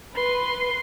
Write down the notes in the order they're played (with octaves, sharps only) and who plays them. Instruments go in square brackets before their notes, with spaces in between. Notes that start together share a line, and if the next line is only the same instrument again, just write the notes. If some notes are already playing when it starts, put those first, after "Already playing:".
[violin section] B4 [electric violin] C6